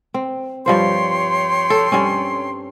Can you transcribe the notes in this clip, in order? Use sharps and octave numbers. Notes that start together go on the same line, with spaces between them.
C4
G2 F3 C5 C#5 G5 C6
A4
G2 C4 C#4